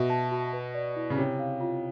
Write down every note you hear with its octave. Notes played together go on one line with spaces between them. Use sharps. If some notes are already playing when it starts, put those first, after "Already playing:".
Already playing: B2 E5
A5
F#4
B4
D5
E4
C#3
C3 C#5
F5
F4